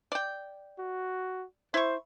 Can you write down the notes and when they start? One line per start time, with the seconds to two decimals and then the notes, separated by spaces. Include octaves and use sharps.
0.12 D5 G5
0.79 F#4
1.74 E4 C5 C#6